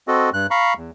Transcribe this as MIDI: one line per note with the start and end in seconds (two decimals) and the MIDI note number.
0.08 0.30 60
0.08 0.30 66
0.08 0.30 69
0.08 0.30 75
0.34 0.47 43
0.34 0.47 90
0.51 0.74 77
0.51 0.74 82
0.51 0.74 83
0.51 0.74 85
0.77 0.91 40